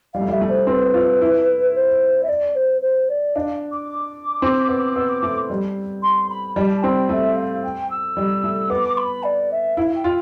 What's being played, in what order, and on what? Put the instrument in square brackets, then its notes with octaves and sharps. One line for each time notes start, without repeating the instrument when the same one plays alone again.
[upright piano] G3 [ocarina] F5
[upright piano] A3
G3
[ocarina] E5
[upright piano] A3
[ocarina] C5
[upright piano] C4 [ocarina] B4
[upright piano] F4
E4
[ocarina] C5
E5
D5
C5
C5
D5
[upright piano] D4 [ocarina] F5
[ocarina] D6
[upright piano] C4
B3
[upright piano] B3 [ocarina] E6
[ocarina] D6
[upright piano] A3 [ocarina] D6
[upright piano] G3
[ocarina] C6
B5
[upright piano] G3 [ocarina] A5
[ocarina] A5
[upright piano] C4 [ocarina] G5
[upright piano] A3 [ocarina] E5
[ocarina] F5
G5
E6
[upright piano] G3
A3
[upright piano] B3 [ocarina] D6
[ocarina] B5
D5
E5
[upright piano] E4 [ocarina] F5
[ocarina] G5
[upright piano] F4